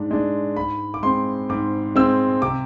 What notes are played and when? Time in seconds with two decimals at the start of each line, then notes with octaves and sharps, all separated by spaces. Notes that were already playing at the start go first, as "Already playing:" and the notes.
Already playing: G#2 G#3 D4
0.11 G#3 D4
0.57 G#2 B5
0.94 D6
1.03 G#3 C4 C6
1.49 G#2 D6
1.96 G#3 C4 E6
2.42 C3 D6